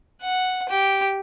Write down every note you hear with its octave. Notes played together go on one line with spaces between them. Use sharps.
F#5
G4